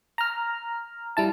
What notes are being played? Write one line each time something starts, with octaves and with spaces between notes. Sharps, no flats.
A#5 F6
G3 E4 A5